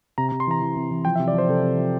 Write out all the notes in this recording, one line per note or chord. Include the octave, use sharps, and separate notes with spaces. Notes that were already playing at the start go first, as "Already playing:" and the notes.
C3 A#5
C3 A#5
C6
E3 A#5
E3
C3
E3
F3 G5
C3 E5
D5
F3 C5
C3 A4
C3
F3